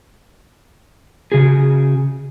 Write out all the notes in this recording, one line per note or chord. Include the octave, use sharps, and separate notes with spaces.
C#3 F#4 G#4